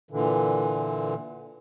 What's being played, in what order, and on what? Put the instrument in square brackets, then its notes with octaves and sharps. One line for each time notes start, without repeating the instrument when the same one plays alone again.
[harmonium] A#2 D3 E3